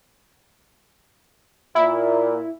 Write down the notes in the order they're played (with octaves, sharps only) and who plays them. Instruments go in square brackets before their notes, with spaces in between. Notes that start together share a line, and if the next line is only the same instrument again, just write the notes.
[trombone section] A#2 [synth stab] E4